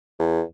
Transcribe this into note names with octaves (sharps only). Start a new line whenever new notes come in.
E2